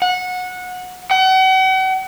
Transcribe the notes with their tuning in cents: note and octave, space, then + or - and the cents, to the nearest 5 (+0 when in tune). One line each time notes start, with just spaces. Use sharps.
F#5 -20
F#5 +40